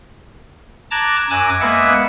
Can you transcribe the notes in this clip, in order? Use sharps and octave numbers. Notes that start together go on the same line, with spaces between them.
A5 A#5 D6 F#6 G#6
F#2 G#5 D6 E6 F#6 A#6
G#3 A#3 B3 B4 E5 F#5